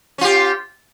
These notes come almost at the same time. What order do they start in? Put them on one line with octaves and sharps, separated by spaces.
C#4 F4 G4